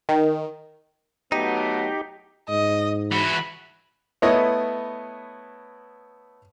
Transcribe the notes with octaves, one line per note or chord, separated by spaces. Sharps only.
D#3
F#3 A3 B3 D#4 G4
G#2 D#5
E3 F#4 B5
A3 B3 E4 C#5 D#5